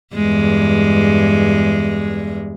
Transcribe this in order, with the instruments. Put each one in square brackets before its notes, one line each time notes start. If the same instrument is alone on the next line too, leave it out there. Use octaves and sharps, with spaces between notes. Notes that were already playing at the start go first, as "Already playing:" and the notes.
[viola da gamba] E2 G2 G#3